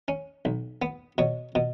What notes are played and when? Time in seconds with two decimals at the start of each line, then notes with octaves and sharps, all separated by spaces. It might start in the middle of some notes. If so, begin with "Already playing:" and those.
0.08 C#4
0.45 B1
0.82 B3
1.18 B2 C#5
1.55 B2